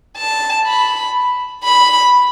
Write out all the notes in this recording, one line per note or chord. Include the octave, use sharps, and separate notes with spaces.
A5
B5
B5